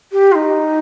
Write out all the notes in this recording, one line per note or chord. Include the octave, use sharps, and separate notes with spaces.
G4
F4
D#4